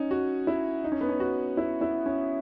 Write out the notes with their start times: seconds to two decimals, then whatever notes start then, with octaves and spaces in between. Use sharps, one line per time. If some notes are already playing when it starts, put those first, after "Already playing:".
Already playing: C#4 D#4
0.11 F#4
0.47 E4
0.84 D#4
0.92 C#4
1.01 B3
1.09 C#4
1.20 F#4
1.57 E4
1.81 E4
2.06 C#4